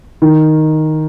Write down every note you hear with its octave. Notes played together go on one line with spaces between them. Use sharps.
D#3